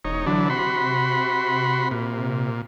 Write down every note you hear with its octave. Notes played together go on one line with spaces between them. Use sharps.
E1 D#4 C#5
D3 E3 F#3 D4
C3 F#4 B5 C6
A#2